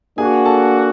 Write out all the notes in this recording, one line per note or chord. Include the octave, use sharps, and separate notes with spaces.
A#3 D4 F#4 G#4 G#5
A4 A5